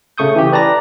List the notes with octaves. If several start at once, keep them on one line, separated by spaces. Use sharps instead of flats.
C#3 A3 C#6 D#6 G6
E3 G4
B4 D5 A5 A#5 A#6